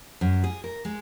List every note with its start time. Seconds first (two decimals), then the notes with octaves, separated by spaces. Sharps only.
0.21 F#2
0.44 G#4
0.64 A#4
0.85 G#3